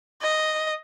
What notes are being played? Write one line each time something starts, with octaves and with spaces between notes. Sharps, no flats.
D#5